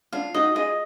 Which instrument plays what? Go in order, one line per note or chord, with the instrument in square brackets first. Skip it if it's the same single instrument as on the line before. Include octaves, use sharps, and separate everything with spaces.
[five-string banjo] D4 F4 [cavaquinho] F5
[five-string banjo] D#4 F#4 [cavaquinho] D#5
[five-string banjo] F4 G#4 [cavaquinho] D#5